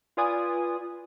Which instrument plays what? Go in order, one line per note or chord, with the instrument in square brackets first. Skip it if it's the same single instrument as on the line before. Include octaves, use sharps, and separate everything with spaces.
[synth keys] F4 B4 D5 G#5 D#6